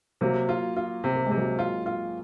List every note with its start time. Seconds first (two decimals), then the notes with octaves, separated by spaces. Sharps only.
0.21 C3 F#3 A#3
0.49 F4
0.76 F4
1.04 C3 C4
1.15 A#3
1.26 G#3
1.31 C3
1.37 F#3 A#3
1.59 F4
1.86 F4